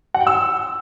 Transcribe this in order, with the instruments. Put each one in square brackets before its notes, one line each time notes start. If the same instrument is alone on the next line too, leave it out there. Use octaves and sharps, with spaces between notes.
[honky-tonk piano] F#5
G5
E6